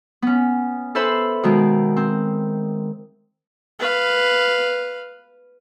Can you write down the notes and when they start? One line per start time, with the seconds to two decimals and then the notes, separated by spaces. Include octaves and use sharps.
0.22 B3 C#4
0.95 A4 B4 C5 E5 B5 C6
1.43 B2 D#3 G#3
1.96 C4
3.79 B4 F5